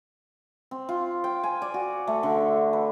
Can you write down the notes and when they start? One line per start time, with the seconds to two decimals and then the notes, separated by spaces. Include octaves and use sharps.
0.71 C4
0.89 F4
1.24 G5
1.43 G#5
1.62 D5
1.74 F#4
2.07 A3
2.23 D3
2.73 B4